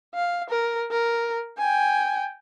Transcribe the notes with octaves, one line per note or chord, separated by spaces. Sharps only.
F5
A#4
A#4
G5 G#5